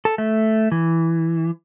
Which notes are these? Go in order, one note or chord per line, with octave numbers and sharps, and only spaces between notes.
A4
A3
E3